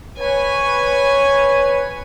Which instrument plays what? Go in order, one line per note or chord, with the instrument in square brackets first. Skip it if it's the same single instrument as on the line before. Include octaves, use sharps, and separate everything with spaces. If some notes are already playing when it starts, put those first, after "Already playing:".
[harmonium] B4 C#5 [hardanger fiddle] G#5